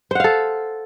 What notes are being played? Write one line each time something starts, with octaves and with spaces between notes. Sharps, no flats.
A4 C5 F5 F#5